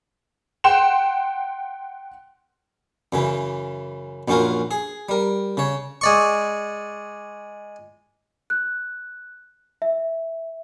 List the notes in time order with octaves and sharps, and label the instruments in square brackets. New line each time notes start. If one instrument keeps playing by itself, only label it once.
[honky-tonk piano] F#5 G5 C6 E7
[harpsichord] F#2 C#3 E3
A#1 F#2 C#4 F4 F#4 A#4
G#4
G3 A#4
C#3 C#5
G#3 D5 C#6
[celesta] F#6
E5